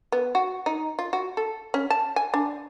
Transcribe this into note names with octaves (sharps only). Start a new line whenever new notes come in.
B3
F#4
D#4
F4
F#4
A4
C#4
A5
G#5
D4